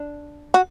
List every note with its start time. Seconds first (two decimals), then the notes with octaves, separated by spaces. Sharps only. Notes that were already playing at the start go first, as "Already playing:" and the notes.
Already playing: D4
0.54 F#4